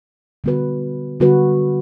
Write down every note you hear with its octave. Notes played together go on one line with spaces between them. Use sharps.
D3 G3 B3 F#4 B4
D3 G3 B3 F#4 B4